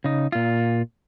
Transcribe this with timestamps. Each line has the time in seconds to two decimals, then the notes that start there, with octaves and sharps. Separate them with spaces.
0.04 C#3 D#4
0.32 A#2 F4